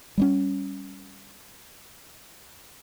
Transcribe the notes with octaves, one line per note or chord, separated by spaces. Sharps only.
G3 A3 C#4